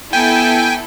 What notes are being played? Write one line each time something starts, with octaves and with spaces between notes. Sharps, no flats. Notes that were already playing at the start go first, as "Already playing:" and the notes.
B3 E4 A4 G5 G#5 G6